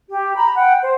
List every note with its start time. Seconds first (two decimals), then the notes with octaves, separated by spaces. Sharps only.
0.09 G4
0.35 A#5 B5
0.56 F#5 G5
0.83 C5